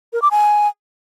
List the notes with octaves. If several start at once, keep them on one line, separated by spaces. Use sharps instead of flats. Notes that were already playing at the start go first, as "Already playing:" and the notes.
A#4
D6
G#5